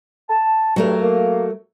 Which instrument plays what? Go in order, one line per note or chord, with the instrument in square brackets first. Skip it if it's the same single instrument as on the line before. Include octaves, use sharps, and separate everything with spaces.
[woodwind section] A5
[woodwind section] G2 [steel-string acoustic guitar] F#3 A3 A#4
[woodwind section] A#3